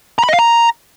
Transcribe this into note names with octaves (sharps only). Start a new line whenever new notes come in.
A#5
B5
D#5
F5
A#5